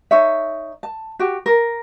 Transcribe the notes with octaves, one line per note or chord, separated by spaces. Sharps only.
D#4 C#5 E5
A5
F#4 G4
A#4